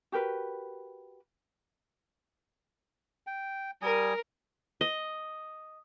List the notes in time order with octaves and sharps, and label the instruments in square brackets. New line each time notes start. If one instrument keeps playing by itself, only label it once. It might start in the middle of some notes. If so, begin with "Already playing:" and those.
[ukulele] F#4 G4 A#4 B4
[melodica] G5
[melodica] G3 G#5 D#6 [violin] A#4
[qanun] D#5